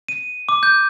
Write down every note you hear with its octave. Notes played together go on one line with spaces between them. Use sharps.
D#7
D6
G6